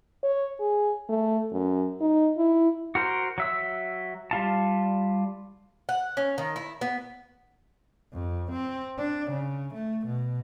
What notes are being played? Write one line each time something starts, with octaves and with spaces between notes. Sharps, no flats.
C#5
G#4
A3
F#2
D#4
E4
F#4 A#4 C5
F#3 E5 E6
G3 F4 A5
F#5
C#4
D#3
E4
B3
F2
C4
D4
C#3
A3
B2